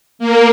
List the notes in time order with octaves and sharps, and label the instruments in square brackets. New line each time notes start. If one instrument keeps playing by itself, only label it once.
[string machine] A#3